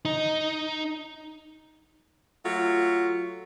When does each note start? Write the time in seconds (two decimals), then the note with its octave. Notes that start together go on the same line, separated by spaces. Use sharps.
0.05 D#4
2.44 F#3 A3 F4